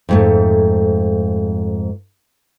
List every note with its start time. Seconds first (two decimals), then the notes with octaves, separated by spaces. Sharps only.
0.09 F2 G#2 A3